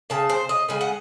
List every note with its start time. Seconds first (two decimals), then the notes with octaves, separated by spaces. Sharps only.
0.10 C#3 G#3 A5
0.30 C5
0.49 D#5
0.69 C#3 G#3 G#5
0.81 F#5